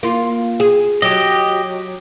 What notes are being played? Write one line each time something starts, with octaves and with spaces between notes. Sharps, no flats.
A#3 F4
G#4
F#3 G4 D#5